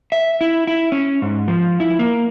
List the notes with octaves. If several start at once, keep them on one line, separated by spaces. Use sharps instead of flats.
E5
E4
E4
C#4
G#2
F3
E4
A#3